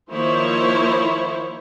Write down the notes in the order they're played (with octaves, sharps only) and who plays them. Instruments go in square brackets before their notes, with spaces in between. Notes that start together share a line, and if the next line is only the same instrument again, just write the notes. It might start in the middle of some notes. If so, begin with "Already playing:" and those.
[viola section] D#3 F3 A#3 E4 C5 C#5